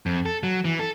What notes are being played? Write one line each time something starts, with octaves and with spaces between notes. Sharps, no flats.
F2
A4
F#3
E3
A4